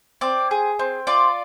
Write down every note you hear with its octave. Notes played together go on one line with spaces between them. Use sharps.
C4 D5
G#4
C4
F4 D5